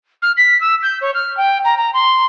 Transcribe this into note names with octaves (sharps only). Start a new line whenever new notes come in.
F6
B6
E6
G6
C#5
F6
G5
A#5
A#5
C6